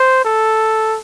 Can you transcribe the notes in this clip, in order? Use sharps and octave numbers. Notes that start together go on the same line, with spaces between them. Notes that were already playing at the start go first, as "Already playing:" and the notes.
Already playing: C5
A4